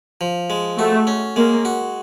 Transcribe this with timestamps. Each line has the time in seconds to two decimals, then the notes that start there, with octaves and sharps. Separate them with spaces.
0.21 F3
0.50 G#3
0.78 A3 F#4
1.07 C#4
1.36 G#3 A#3
1.65 F#4